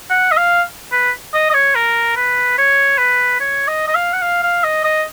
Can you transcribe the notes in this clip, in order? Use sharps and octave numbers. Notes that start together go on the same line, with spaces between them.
F#5
D#5
F5
B4
D#5
D#5
C#5
A#4
B4
C#5
B4
C#5
D#5
D#5
F5
F#5
F5
F5
D#5
D#5